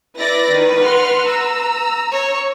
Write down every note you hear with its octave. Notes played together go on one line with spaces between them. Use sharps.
E4 B4 D5 A#6
D#3
F#5 C6 F6
A#5 E6
C#5